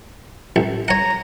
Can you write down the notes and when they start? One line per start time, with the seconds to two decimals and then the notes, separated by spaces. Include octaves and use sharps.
0.56 A1
0.88 C#5 F#5 A#5